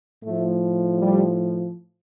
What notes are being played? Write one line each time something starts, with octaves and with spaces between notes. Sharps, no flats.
A2 F3 A3
G3